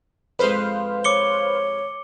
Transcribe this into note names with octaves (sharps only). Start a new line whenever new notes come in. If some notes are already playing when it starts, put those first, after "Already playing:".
F2 G#3 B4 C5 F5
C#5 D6 C#7 G7